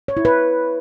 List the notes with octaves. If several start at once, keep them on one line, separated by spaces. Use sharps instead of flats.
C#5
E4
B4